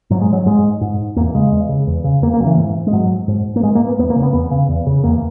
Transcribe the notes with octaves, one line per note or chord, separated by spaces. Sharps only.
G#2 F#3
G#3
F#3
G#2 G#3
G#2
E2 A#3
C#3 G#3
E2
C#3
E2
C#3
E2 A#3
A#3
C#3 F#3
E3
G#2
G#3
G#2 F#3
G#2
A#3
G#2 G#3
A#3
B3
E2 B3
A#3
C#3
B3
E2 B3
C#3
E2
C#3
E2 A#3